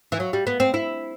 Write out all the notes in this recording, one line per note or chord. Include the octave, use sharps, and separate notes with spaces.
E3
F#3
G3
B3
C4
E4